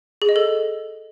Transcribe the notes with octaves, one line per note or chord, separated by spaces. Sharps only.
G#4
D#5
A4